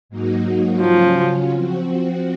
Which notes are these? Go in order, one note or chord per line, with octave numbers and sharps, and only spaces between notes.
G#2 F#3 A#3 D#4 F#4
C#3 F3 F#3 C#4 F4
F3 C4 F#4